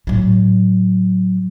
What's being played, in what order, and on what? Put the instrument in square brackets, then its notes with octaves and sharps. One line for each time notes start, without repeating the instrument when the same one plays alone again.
[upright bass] A2 F#3